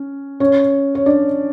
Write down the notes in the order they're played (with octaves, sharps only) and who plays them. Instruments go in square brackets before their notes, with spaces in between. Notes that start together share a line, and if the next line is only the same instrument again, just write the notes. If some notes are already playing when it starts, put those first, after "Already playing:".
Already playing: [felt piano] C#4
C#4 C#5
C#5
D4 D5